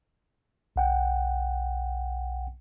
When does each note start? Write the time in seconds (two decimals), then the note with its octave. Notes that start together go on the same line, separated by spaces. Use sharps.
0.76 B1 F#5 G5